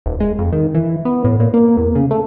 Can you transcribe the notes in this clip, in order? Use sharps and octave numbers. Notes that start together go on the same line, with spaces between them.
D#1
G#3
F2
D#3
E3
B3
A2
A#2
A#3
E2
C#3
A3